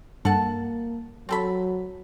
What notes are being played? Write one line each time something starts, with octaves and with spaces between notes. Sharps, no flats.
G2 A#3 A4 F#5 A5
F#3 C4 A4 B5